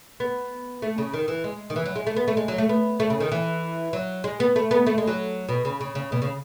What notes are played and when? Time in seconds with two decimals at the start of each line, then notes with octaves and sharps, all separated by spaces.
0.20 B3
0.82 A3
0.98 C#3
1.14 D#3
1.28 E3
1.44 G#3
1.70 D#3
1.76 E3
1.86 F#3
1.96 G#3
2.07 A3
2.16 B3
2.28 A3
2.37 G#3
2.48 F#3
2.58 A3
2.69 B3
3.00 A3
3.10 C#3
3.20 D#3
3.32 E3
3.93 F#3
4.24 G#3
4.40 B3
4.56 A3
4.71 B3
4.87 A3
4.98 G#3
5.07 F#3
5.49 B2
5.65 C#3
5.81 C#3
5.95 C#3
6.12 B2
6.22 C#3